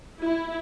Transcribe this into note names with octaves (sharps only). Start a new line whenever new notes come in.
E4